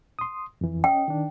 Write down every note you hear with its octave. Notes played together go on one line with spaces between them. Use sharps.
C6 D#6
F2 E3
C#4 D#5 G5
D#3 D4